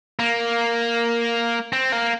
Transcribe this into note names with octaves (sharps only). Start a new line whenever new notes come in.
A#3
C4
A#3